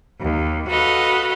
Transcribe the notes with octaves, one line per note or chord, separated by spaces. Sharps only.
D#2
F#4 A4 B4 D#5 F5